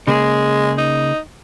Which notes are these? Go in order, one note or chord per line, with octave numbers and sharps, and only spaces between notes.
C#3 G#3 A#3 G#4
D#4